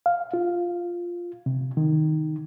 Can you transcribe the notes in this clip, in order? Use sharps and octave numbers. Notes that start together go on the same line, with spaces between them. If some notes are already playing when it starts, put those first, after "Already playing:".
F5
F4
C3
D#3